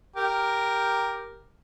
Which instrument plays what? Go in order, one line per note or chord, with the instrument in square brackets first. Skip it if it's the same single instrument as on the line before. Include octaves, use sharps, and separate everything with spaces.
[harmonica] G4 A#4